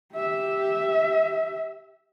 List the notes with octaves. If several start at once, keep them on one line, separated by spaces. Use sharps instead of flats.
G4 E5